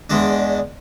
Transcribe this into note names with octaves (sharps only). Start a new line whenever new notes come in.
E2 G#3 D4